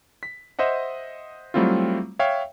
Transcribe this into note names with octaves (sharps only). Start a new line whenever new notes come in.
B6
C5 D#5 E5 F#5
F#3 G3 A3 C4 E4 F4
C#5 E5 F5 G5